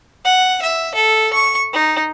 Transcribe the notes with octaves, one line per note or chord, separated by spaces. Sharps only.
F#5
E5
A4
C#6
D#4